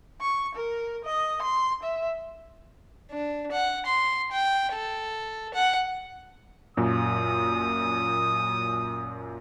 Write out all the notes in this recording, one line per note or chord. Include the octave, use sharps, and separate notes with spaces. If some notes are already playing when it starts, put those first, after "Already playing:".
C#6
A#4
D#5
C6
E5
D4
F#5
C6
G5
A4
F#5
F#2 A#2 D#6